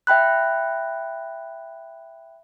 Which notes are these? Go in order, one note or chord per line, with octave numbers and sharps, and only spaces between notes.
E5 G5 B5 F#6